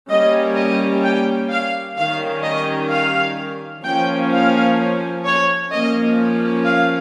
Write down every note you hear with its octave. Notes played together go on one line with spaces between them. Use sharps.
G3 A#3 C#4 D#5
D#5
G5
F5
D#3 G3 C#4 F5
D#5
F5
F3 A#3 C#4 G5
F5
C#5
F3 A#3 C#4 D#5
F5